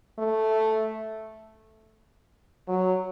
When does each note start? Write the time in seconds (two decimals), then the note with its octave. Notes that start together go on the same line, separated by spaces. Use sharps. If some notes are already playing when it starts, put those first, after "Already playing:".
0.19 A3
2.68 F#3